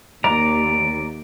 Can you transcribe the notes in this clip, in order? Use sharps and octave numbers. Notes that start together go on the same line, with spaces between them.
D#2 D5 A#5